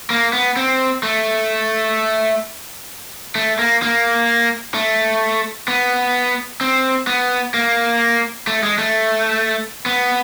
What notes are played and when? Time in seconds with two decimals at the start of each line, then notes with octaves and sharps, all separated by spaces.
0.10 A#3
0.33 B3
0.57 C4
1.03 A3
3.35 A3
3.59 A#3
3.82 A#3
4.75 A3
5.68 B3
6.61 C4
7.07 B3
7.54 A#3
8.47 A3
8.63 G#3
8.78 A3
9.86 B3